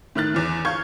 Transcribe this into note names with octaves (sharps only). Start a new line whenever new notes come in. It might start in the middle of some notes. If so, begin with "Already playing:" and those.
A2 D#3 F6 F#6 A6
E2 E3
F5 C#6 G6 G#6